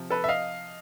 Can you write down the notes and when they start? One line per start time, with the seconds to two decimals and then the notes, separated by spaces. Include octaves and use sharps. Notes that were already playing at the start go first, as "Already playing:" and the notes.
Already playing: C3 F3
0.10 A4 B4
0.24 E5
0.29 D#5 F5